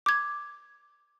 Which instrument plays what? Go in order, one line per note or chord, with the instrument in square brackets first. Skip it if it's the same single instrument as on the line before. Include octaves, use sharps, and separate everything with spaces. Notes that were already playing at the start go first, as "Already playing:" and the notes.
[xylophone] D6 G#6